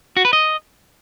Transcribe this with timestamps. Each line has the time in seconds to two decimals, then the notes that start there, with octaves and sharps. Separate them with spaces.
0.17 F#4
0.25 B4
0.33 D#5